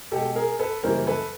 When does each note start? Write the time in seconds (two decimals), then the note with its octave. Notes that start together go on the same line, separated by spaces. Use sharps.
0.12 B2 G#3 G4 A4
0.35 G#4 A#4
0.59 A4 B4
0.83 F#2 C#3 E3 G3 A#3 A#4 C5
1.07 A4 B4